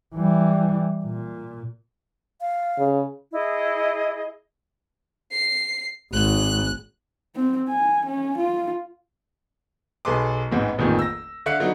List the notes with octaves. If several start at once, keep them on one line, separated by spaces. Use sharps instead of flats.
E3 G3
A#2
F5
C#3
E4 G#4 D#5
C7
G#1 F#6
C4
G#5
C#4
F4
B1 G#4 A4 B4 C6 D6
A1 E2 G#2 E3 G#3
D#1 A1 F2 A#2 D#3 G#4
E6 A#6
D3 E5 F5 F#6 C#7
D3 F#3 B3 D#4